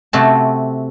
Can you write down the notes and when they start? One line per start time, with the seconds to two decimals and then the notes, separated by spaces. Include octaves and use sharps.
0.13 C3 A3 F#4 A5